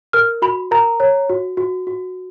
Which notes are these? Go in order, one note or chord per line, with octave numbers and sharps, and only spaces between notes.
A#4 F6
F#4 B5
A#4 A#5
C#5
F#4
F#4
F#4